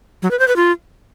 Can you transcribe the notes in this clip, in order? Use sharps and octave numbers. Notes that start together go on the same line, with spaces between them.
F#3
B4
C5
B4
F4